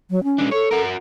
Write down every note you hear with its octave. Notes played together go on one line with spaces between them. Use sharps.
F#3
C#4
G#3 D4
A4 C#5
F#4 A#4